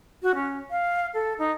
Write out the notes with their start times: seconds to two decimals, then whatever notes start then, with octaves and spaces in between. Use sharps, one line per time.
0.23 F#4
0.35 C#4
0.71 F5
1.14 A4
1.39 D#4